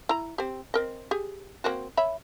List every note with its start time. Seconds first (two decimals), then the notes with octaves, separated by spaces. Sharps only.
0.09 E4 A#5
0.38 C4 G4
0.74 C4 A#4 D#5
1.11 G4 G#4
1.64 A#3 C4 F#4
1.97 C#5 E5 B5